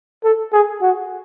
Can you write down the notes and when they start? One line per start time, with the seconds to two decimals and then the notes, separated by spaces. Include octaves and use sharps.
0.24 A4
0.52 G#4
0.82 F#4